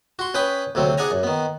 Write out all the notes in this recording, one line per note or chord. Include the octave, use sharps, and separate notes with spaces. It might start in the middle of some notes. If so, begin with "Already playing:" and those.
F#4 C6
C#4 B4 G5 B5 D#6
D2 C3 F#3 C4
D4 G#4 F#5 G#5 A#5
F#2
D#3 B3